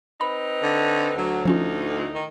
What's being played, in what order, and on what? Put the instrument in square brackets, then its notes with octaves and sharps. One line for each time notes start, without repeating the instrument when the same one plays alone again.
[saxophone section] C4 D#4 B4 [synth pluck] B5
[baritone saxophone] D3
[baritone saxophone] D2 [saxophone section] F#3
[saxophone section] A2 D#4 [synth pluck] F3 C#4 F4
[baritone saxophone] D#3